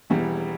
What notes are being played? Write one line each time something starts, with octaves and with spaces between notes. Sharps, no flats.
E1 E2 E3 G3